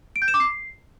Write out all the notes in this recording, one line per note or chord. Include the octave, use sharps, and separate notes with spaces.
D7
G6
E7
D6
C7